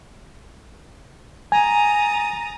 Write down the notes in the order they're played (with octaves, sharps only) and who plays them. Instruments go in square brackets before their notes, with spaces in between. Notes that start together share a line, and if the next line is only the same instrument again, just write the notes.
[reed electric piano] G#5 [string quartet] A#5 D#6 A6